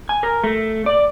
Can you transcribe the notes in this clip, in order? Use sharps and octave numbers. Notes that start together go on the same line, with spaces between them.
G#5
A#4
A3
D5